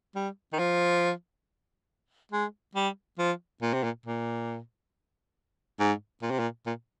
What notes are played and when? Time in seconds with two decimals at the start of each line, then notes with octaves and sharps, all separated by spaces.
0.16 G3
0.53 D#3
0.59 F3
2.32 G#3
2.75 G3
3.19 F3
3.62 A#2
3.74 C3
3.84 A#2
4.06 A#2
5.79 G#2
6.22 A#2
6.31 C3
6.40 A#2
6.66 A#2